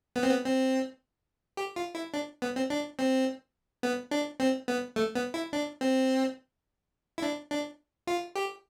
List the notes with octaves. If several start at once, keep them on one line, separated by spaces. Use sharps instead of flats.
B3
C4
B3
C4
G4
F4
E4
D4
B3
C4
D4
C4
B3
D4
C4
B3
A3
B3
E4
D4
C4
E4
D4
D4
F4
G4